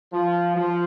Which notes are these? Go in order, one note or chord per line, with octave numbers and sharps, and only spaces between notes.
F3
F3